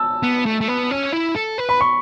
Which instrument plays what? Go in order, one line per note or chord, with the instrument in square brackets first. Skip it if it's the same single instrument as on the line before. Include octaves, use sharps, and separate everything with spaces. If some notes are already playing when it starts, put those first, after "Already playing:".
Already playing: [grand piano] A5 E6
[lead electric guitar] B3
A3
A3
B3
C#4
E4
A4
B4
[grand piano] B5
C#6